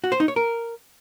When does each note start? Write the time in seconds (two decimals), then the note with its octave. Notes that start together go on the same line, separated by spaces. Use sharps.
0.04 F#4
0.12 C5
0.20 D#4
0.28 C#5
0.36 A#4